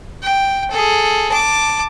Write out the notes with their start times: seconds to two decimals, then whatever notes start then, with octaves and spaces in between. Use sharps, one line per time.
0.22 G5
0.71 G#4 A4
1.31 A5 D6